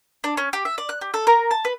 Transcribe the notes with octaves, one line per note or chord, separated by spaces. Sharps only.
D4
C#4
G4
E5
D5
F#6
G4
A4
A#4
A5
B4